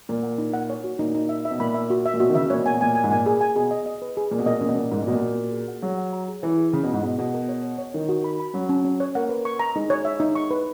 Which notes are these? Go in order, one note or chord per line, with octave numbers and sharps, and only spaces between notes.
A#2 A#4
F#5
D#4
F#5
C#5
F#4
A#2 D#4
D#4
E5
E5
B2
A#2 B5
E5
F#4
E5
A#2
B2 F#4
D#3
C#3 E5
A#2 C#5
B2
A#2 G#5
B2
A#2 G#5
G#5
G#2
A#2 G#5
G#4
G#5
B2 G#4
D#5
D#5
B4
G#4
A#2 A#4
B2
A#2 D#5
B2
A#2 C#4
B2
A#2 D#5
G#2 A#4
A#2
A#2 B2 F#4
F#4
F#4
G#4
F#5
F#3 G#4
F#5
A#5
G#4
E3 F#5
G#4
C#3 G#4
B2
G#2 E4
B2 G#4
B2 G#4
A#4
C#5
C#5
C#5
D#3 C#5
F#4
B5
B5
F#3 C#4
C#4
C#4
C#5
A#3 F#5
B4
C#6
A#5
G#3 D#4
C#5
E5
D#4
C#6
B4